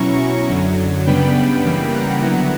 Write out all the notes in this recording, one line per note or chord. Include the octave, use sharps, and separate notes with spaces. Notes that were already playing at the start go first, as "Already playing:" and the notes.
Already playing: B2 F#3 C#4 E4 A#5 C#6
A#5 C#6
F#2 D3 F#3
F#2 C#3 G3 B3 D4 G5 B5
C#3 E3 G3 A#3
F#5 A#5
D3 F#3 B3 E4